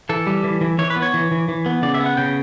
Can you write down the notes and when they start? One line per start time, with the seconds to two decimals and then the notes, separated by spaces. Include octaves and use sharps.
0.09 E3 A4
0.27 G3
0.44 E3
0.61 E3
0.78 E3 C#5
0.90 B4
0.96 B3
1.02 C#5
1.14 E3
1.31 E3
1.49 E3
1.66 B3
1.82 C#3 D5
1.94 E5
2.00 B3
2.06 F#5
2.17 C#3 G5